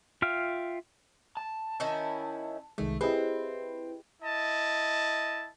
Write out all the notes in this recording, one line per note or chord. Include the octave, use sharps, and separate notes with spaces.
F4 E5 F5 G5 F6
A5
D#3 C#4 E4
C2 D#3 G#3 A3
C4 E4 G4 G#4 B4 D#5
E4 D#5 A5